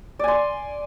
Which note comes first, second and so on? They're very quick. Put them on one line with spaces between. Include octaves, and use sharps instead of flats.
D5 G#5 C6